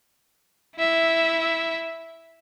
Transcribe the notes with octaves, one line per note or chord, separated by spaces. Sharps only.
E4 E5